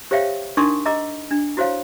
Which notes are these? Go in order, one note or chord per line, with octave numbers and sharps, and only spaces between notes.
G4 C5 C#5 E5 F5 G5
D4 D#4 A#4 C6 C#6 D#6
D#5 A#5 D6 E6
D4
E4 F#4 C5 C#5 F5